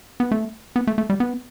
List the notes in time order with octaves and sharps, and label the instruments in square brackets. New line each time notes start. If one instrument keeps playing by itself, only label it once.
[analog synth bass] B3
A3
B3
A3
A3
G3
B3